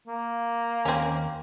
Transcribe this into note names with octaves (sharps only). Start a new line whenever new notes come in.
A#3
D#2 C4 C#4 G#5